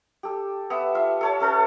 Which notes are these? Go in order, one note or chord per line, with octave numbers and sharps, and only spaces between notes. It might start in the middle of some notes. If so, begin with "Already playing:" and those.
G4 A4
B3 E5
F4 E5
A4 C#5 A5
C#4 A4 B4